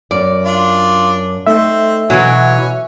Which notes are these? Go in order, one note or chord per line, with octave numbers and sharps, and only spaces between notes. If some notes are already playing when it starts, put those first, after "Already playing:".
F#2 D5
D4 F4
A3 C4 D#4 E5
B2 E3 F#3 C#4